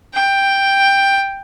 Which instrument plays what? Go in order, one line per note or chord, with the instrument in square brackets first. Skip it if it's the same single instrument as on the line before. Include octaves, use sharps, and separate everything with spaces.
[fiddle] G5